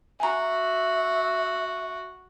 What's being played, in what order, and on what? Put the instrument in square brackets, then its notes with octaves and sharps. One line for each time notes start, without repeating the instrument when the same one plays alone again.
[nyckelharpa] F#4 [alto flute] E5 [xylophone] G#5 A#5